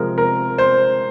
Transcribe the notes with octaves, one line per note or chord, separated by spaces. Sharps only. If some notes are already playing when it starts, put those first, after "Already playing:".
Already playing: C3 F3 G#3 A#4
A#4
C5